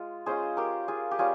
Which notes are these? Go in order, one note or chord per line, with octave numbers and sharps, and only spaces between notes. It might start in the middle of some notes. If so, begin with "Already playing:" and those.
Already playing: G#3 F4
G#3 C#4 F4 G#4 C5
G4 A#4
F4 G#4
G4
G3 C#4 F4 G#4